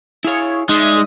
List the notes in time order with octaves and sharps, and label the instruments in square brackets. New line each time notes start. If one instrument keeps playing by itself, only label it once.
[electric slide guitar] E4 F5 [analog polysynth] G#4 C#5
[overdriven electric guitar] G#3 [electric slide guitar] D#4 [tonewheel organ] G#4 [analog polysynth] D5 E5 D#6